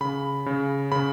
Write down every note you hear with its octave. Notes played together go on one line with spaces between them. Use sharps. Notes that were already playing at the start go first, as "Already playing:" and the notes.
C#3 B5
C#3
C#3 B5